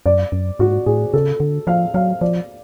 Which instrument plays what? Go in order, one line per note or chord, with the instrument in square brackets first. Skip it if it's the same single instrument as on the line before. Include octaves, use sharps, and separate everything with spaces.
[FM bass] F#2 [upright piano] D5
[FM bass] F#2
[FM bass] G#2 [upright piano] F#4
[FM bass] A2 [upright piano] G#4
[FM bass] C#3 [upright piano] A4
[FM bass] D3
[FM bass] F3 [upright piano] F5
[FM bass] F#3 [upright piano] F5
[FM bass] F3 [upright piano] D5